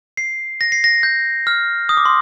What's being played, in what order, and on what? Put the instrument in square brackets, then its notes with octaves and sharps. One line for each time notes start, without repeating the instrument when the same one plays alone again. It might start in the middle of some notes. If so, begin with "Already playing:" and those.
[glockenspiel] C7
A#6
C7
A#6
G6
F6
D#6
D6
C6